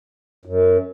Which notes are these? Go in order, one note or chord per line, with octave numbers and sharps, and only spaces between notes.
F#2